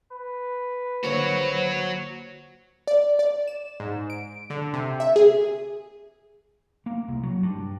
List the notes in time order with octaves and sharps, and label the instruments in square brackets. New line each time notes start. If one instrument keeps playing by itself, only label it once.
[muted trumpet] B4
[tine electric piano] G#1 D3 A#3 [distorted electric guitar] F#4 C#5 [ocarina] C5
[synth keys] D5
D5
E7
G#2
D7
D3
C3
E5
G#4
[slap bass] A#3
C2
F#3
G2